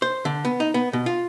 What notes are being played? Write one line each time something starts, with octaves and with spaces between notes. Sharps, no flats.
C5
D3
B3
D#4
B3
B2
F4